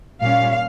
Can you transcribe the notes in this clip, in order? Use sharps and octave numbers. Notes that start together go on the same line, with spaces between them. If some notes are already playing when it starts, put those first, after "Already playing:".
A#2 G3 C#4 F5